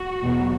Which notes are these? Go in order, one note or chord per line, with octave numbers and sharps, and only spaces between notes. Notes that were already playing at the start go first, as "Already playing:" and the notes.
Already playing: F#4
E2 B2 F#3 B3